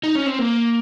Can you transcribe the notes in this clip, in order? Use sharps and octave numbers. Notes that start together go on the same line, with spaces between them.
D#4
C#4
C4
A#3